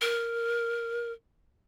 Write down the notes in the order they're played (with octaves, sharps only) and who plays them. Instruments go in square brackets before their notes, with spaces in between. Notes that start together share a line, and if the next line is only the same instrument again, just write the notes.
[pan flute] A#4